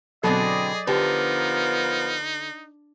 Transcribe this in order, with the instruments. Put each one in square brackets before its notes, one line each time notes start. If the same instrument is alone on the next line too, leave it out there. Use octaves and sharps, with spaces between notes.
[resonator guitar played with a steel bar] B2 D3 C4 [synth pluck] F#3 A4 [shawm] G#4 [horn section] D5 D#5
[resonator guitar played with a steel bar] D3 [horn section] F3 B3 A#4 [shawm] D#4 [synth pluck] G4 B4